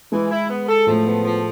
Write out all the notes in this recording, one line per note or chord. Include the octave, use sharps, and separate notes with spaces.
E3 G#3 G#4
E4
B3
A4
A2 F3 A3
B3
F3